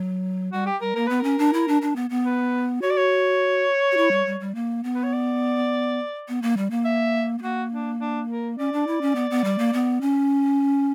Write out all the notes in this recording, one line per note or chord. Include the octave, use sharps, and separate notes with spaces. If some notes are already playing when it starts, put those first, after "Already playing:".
Already playing: F#3
G3 F#4
G4
G3 A#4
A#3 A#4
B3 B4
C#4 A#4
D4
E4
D4
D4
B3
B3
B4
F#4 C#5
D5
C#5
F#4
E4
G3
G3
G3
A#3
B3
B4
C#5
D5
B3
A#3
G3
A#3
E5
B3
A#3 F#4
D4
D4
A#4
C#4 D5
D4
E4
C#4
B3
B3
G3
A#3
B3
C#4